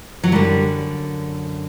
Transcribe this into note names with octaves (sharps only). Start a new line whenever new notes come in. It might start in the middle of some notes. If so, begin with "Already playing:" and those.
F#3
F#2 D3 G3